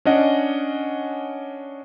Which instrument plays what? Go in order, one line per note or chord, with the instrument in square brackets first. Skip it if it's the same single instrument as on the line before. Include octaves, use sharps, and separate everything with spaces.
[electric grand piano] C#4 D4 D#5 F#5